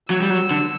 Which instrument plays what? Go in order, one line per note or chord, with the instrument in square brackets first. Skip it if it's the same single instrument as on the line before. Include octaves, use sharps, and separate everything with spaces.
[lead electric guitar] F#3 [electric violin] E6
[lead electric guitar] G3
F#3
D3